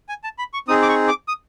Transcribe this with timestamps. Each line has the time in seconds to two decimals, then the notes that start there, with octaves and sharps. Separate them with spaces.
0.09 G#5
0.24 A5
0.39 B5
0.54 C#6
0.68 C4 D#4 G#4 D#6
0.82 D6
0.89 C#6
1.08 D6
1.28 D#6